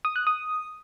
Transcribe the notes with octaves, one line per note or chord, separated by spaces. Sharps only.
D#6
F#6
D#6